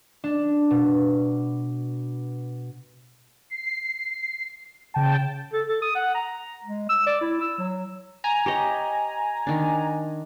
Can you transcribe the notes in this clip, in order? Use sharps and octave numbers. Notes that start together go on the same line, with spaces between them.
D4
B2
C7
C#3 G5 A5
A4
A4
D#6
F#5
A#5
G#3
E6
D5
E4
E6
F#3
G#5 A#5
G4 C#5 D#5
D#3 D4